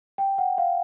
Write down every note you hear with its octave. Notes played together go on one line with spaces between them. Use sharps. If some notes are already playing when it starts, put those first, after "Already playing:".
G5
F#5
F5